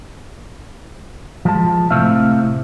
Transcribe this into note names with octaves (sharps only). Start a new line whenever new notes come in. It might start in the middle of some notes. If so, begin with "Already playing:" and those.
F3 G#3 A5
A2 C3 A3 C4 E5 F5